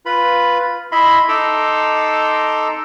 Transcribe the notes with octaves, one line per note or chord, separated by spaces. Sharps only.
F4 B4 B5
E4 D#5 E5 B5 C6
D#4 A4 A#5 C6 D6 E6